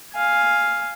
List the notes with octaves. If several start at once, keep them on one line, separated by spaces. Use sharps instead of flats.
F5 G#5